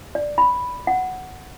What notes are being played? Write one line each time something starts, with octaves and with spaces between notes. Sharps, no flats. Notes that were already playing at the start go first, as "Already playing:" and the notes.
D5
B5
F#5